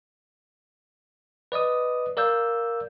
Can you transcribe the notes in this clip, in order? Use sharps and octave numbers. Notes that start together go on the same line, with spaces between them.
B4 D5 D#5 D#6
A#4 D5 F5 E6 G6